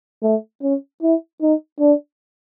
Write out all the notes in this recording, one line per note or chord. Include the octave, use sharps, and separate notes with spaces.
A3
C#4
E4
D#4
D4